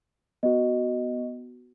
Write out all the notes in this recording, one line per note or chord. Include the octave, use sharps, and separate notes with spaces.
B3 F#4 D#5